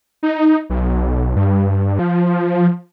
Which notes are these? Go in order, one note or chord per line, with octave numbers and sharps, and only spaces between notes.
D#4
B1
G2
F3